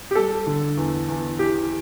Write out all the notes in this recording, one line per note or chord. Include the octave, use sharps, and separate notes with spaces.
G4
G3 A4
D3
E2
E2
E3 G4